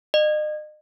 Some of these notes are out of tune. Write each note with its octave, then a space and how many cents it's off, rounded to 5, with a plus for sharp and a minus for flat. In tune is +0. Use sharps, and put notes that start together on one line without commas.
D#5 -40